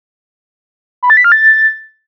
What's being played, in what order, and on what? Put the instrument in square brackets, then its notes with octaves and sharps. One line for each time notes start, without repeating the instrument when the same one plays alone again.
[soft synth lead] B5
A6
B6
F6
A6